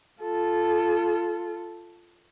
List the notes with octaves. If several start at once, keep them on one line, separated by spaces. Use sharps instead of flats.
F4 A4